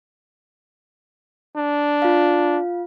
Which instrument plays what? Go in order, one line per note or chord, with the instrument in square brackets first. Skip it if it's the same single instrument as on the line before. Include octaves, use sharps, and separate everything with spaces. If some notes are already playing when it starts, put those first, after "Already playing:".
[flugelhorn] D4
[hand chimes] F4 F5